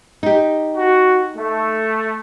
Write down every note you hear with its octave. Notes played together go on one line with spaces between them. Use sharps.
D#4 G4
F#4
A3